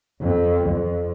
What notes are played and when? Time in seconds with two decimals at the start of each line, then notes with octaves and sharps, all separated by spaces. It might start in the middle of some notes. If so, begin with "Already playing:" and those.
0.21 F2
0.68 F2